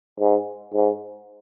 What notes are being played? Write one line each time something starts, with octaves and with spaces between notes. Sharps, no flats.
G#2
G#2